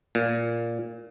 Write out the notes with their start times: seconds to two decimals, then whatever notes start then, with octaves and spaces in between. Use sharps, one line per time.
0.15 A#2